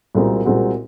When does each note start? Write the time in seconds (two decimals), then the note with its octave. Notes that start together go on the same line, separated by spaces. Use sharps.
0.15 C2 A#2 G#3 C4 F#4
0.45 C2 A#2 G#3 C4 F#4